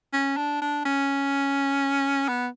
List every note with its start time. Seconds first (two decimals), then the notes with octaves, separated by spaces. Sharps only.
0.13 C#4
0.37 D4
0.62 D4
0.85 C#4
2.28 B3